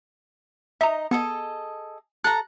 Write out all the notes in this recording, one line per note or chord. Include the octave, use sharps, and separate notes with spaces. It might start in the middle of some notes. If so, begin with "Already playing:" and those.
D#4 D#5 E5 A#5
B3 G#4 A4 D#5 C#7
A4 A#5 F#6